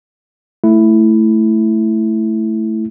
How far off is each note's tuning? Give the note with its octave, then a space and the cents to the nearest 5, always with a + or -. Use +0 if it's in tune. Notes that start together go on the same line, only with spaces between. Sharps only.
A3 +0 E4 +0